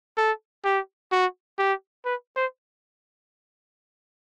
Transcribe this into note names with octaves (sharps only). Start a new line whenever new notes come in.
A4
G4
F#4
G4
B4
C5